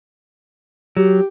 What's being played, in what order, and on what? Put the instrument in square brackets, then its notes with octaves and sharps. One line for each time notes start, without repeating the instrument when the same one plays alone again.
[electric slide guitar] F#3 [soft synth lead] G4